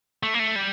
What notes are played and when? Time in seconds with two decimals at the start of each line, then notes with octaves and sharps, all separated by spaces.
0.23 A3
0.34 A#3
0.39 A3
0.56 G3